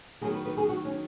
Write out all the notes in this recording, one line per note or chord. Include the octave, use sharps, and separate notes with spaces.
D#3 F#3 B3 G#4
B4
B4
G#4
F#4
C#4